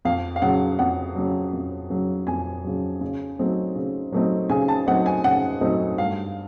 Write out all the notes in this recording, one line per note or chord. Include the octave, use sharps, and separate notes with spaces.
F2 F5
F5
C#3 F#3 F#5
F2 F#5
C#3 F#3
F2
C#3 F#3
F2 G#5
C#3 F#3
C#3
F#3 A3 C4 D#4
C#3
F#3 A3 C4 D#4
C#3 G#5
A5
F#3 A3 C4 D#4 F#5
G#5
C#3 F#5
F#3 A3 C4 D#4
G2 F5